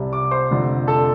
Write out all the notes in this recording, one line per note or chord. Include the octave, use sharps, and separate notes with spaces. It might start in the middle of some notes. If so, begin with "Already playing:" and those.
Already playing: C2 C3 G3
D5 D6
C5 C6
F1 F2 D3 G3
A4 A5